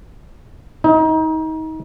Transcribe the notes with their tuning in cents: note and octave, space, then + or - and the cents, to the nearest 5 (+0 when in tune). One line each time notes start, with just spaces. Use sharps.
D#4 +30